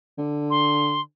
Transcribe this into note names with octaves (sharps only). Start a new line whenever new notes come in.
D3
C6